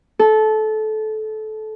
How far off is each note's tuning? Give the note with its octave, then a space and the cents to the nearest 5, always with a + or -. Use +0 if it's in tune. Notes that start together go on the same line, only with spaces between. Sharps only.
A4 -20